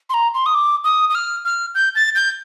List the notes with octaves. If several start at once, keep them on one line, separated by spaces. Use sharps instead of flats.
C6
A#5
C6
D#6
D6
D#6
D#6
F6
F6
G6
A6
G6